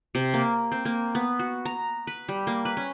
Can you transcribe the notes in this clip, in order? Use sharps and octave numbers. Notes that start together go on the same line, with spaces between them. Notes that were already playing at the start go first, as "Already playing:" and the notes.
C3
A#3
C4
A#3
B3
F#4
A#5
B4
G3
A#3
B4
C#4